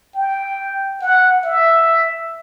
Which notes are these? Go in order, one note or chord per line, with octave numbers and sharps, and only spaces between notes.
G5
F#5
E5